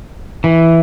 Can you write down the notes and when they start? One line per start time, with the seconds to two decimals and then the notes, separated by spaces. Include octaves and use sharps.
0.44 E3